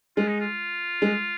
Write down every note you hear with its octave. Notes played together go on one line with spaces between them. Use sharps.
G#3 F4
D#4
F4
G#3